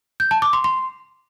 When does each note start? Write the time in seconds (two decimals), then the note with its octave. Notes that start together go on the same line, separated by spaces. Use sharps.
0.20 G6
0.31 A5
0.42 D6
0.53 C6
0.64 C6